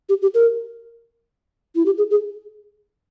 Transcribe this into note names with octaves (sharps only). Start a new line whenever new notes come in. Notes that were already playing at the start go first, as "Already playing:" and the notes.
G4
G4
A#4
E4
G4
G#4
G#4